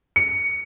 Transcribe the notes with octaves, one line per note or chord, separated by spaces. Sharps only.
C#7